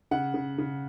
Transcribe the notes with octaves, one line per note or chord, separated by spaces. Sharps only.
C#3 F#5
C#3
C#3